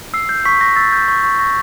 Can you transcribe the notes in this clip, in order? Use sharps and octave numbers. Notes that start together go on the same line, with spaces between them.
E6 C7
G6
C#6 B6
C#6 A#6
E6 A6
G6
C#6
C#6
C#6 A#6